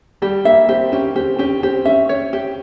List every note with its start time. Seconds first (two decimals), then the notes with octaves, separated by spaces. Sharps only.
0.22 G3 G4
0.45 A#3 E5
0.69 C4 G4
0.92 C#4 G4
1.15 C4 G4
1.39 C#4 G4
1.62 C4 G4
1.85 C#4 E5
2.09 C#5
2.33 G4